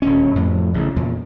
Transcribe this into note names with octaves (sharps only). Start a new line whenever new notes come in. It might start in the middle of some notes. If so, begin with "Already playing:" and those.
D#1 D2 C#4
F2 A2
A1 C#3
E2 A#2